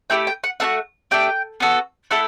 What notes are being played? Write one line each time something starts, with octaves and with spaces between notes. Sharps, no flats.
A3 E4 G4 G5
G5
F#5
A3 D4 F#4 F#5
A3 D4 G4 G5
B3 F#4 A4
A3 E4 A4 F#5